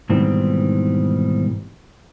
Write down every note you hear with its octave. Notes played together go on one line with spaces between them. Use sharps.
G#2 B2 D#3 E3 G3 C4